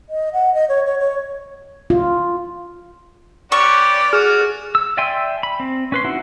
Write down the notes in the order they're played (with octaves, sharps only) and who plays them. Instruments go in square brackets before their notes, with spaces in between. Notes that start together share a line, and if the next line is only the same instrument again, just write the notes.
[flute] D#5
F#5
D#5
C#5
C#5
C#5
[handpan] F4
[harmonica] C#4 G4 B4 [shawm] D5 [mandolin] C#6
[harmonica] F#4 [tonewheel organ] G#4 F6
[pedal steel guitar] E6
D5 E5 G5 G#5 C6
B5
C4
C#4 B4 C6
D#4 E4 F#4